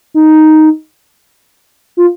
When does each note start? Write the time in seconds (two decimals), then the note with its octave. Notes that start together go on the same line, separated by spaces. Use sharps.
0.14 D#4
1.97 F4